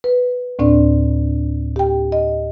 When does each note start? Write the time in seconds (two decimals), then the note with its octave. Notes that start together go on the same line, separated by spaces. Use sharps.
0.04 B4
0.59 D2 A2 C4 D4 D5
1.76 G4 G5
2.12 D#5